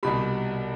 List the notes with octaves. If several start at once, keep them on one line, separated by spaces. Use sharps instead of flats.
C2 B2 G3 B5